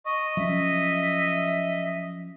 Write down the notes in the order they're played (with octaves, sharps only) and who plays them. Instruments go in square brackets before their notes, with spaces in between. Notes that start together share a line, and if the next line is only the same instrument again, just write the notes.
[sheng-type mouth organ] D#5 [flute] C#6
[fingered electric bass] F3 F#3 C#4 [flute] E5